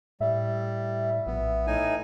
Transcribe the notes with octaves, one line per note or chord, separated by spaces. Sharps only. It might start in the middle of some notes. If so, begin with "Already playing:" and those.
A2 G3 E5
A#1 B3
A2 D#4 G#5